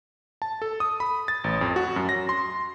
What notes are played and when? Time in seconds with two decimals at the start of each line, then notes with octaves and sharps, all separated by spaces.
0.42 A5
0.62 A4
0.80 D#6
1.00 B5
1.28 A6
1.44 A1
1.61 F2
1.76 F#4
1.96 F#2
2.09 A#6
2.29 C6